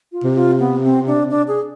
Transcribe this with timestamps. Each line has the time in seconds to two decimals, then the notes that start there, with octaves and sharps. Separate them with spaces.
0.12 F4
0.24 C3
0.35 F4
0.59 B3
0.83 C4
1.07 D4
1.30 D4
1.48 G#4